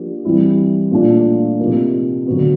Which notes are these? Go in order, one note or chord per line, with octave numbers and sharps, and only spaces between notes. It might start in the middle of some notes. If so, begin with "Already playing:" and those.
Already playing: F3 A#3 D4 G4
E3 G3 C4 E4
A#2 F3 A3 D4 F4
C3 F3 A#3 D#4
D3 F#3 B3